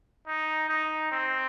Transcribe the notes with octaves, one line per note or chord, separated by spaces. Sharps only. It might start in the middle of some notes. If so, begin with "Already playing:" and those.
D#4
D#4
C4